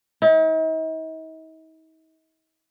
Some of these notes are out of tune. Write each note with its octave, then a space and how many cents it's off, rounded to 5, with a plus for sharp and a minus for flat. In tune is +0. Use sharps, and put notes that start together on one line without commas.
D#4 +45